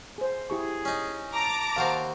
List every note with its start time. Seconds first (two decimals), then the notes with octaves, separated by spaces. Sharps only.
0.18 G#4 C5
0.50 E4 G4 G#4 C#6
0.85 C#4 D#4
1.34 A5 A#5 D6
1.76 D#2 F#4 C5 F5